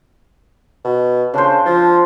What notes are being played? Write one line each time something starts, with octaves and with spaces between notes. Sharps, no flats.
B2
C#3 D4 C5
F3